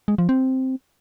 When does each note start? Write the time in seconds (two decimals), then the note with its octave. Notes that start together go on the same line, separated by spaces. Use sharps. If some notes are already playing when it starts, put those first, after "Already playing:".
0.08 G#3
0.18 F3
0.29 C4